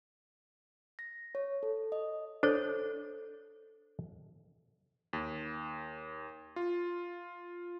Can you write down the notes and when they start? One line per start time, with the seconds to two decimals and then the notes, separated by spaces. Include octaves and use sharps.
0.99 A#6
1.35 C#5
1.63 A4
1.92 D#5
2.43 D4 A4 C5 C#5
5.13 D#2
6.56 F4